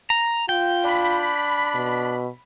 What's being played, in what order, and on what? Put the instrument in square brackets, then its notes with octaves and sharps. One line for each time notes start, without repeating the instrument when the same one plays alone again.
[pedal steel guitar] A#5
[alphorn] F4 [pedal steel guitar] G5
[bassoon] D4 [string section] B5
[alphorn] B2